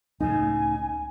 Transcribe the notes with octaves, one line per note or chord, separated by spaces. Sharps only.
C#2 A2 C#3 D#4 G#5